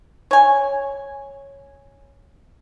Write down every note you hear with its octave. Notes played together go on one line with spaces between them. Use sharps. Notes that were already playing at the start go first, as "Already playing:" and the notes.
C#5 G#5